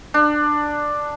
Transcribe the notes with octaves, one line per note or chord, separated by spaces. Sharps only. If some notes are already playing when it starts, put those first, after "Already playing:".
D4